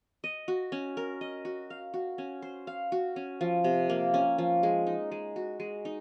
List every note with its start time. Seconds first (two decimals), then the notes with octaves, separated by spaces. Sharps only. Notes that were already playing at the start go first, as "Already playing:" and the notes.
0.24 D#5
0.48 F#4
0.72 C#4
0.97 A#4
1.21 D#5
1.45 F#4
1.70 F5
1.94 F#4
2.18 C#4
2.42 C5
2.67 F5
2.92 F#4
3.16 C#4
3.41 F3
3.64 C3
3.89 A#3
4.14 C#4
4.38 F3
4.63 G#3
4.87 D#4
5.12 G#3
5.36 F#4
5.60 G#3
5.85 D#4